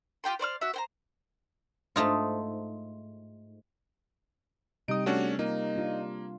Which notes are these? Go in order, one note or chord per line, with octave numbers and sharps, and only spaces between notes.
F4 G4 G5 C6
C5 D5 C6 F6
F#4 E5
C5 G5 A#5
G#2 A3 D#4 F4
C3 G3 D#4 G4 D#6 D7
A3 C#4 D4 F#4
A#3 D#4 F4
D4 F4